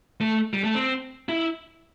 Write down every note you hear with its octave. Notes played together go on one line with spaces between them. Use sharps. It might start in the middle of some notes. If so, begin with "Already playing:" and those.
A3
G3
A3
C4
E4